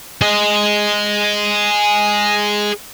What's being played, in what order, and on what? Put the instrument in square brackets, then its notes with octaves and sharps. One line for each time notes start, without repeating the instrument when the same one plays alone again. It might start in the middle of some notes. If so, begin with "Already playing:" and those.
[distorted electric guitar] G#4 D#5